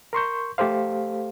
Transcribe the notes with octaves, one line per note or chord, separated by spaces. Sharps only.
A#4 C6 C#6 G6
A3 G4 A4 C5 F5